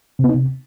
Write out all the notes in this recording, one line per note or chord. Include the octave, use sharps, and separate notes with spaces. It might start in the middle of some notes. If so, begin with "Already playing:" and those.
C3
B3
D#4
C3